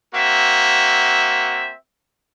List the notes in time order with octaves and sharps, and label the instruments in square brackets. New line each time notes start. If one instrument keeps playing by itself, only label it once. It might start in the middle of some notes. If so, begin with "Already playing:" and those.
[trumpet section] A#3 C4 F#4 E5